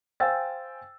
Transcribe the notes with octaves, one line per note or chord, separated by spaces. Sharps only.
C5 F5 G5 G#5 E6 A6